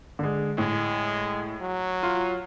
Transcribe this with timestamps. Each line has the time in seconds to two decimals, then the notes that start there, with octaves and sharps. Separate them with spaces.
0.19 D3 G#3
0.58 A2 G#3
1.61 F#3
2.03 F4